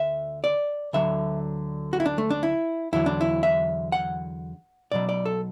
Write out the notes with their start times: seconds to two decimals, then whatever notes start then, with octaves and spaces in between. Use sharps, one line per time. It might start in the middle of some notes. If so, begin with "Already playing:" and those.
Already playing: D2 D3 E5
0.44 D5
0.93 D2 D3 F#3 E5
1.93 F#4
2.00 E4
2.06 D4
2.18 A3
2.30 D4
2.43 E4
2.93 E2 D3 F#3 E4
3.06 D4
3.21 E4
3.43 E5
3.92 F#5
4.92 B1 B2 F#3 D5
5.09 D5
5.25 A4